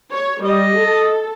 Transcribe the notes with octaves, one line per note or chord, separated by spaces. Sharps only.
C#5
G3 D#5
A4